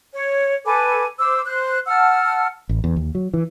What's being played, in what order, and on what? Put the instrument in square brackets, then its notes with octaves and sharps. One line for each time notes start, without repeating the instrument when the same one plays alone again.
[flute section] C#5
A4 B4 G#5 D6
C5 D6 E6
C5 F#6
F#5 A5 E6 F6
[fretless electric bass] A1
E2
D#2
F#3
E3